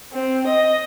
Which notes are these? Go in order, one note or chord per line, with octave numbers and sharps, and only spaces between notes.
C4
D#5